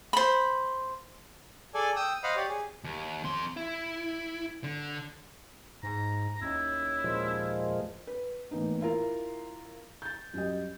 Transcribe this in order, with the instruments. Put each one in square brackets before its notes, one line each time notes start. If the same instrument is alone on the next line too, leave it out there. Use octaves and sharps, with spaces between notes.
[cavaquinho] C5 B5
[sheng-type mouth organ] G#4 A4 D5 G#5
G5 D#6 E6
C5 D#5 F5 F#5 B5
G4 C#5 D5
G#4
[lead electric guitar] D#2
F2 C6
E4
D3
[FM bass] G#2 [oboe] A#5
[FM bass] D#2 [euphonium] C#4 [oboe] E4
[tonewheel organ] A#2 F3 G#3
[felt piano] B4
A2 E3 A#3 B3 D#4
E4 F4 A#4
G6 A6
F#2 G3 D#5